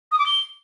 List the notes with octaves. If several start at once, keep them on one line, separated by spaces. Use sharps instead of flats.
D#6
D6
G7